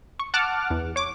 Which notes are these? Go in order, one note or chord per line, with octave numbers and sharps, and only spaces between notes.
C#6
F#5 A5 D6 F6 F#6
E2
C#5 D6